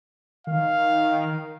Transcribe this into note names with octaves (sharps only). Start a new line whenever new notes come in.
D#3 F5